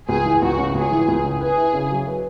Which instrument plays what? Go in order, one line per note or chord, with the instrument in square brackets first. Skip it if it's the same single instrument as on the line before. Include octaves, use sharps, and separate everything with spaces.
[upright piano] C#2 [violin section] G#4
[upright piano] E3
[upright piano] C#2 [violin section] F#4
[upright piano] C#3
[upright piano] C#2 [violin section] G#4
[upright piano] E3
C#2
C#3
[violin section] G#4 [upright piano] B4
[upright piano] E4
C#3
F#3
B4